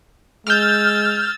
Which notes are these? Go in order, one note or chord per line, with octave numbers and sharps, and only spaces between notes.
G#3 E6 F6 G6 A6